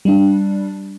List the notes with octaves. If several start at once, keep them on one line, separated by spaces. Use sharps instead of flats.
G3 D4